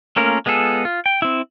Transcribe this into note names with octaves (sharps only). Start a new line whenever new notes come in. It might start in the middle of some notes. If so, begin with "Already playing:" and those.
A3 A#3 C#4 F4 A#4
G#3 B3 F4 G#4 A4
F4
G5
C4 E4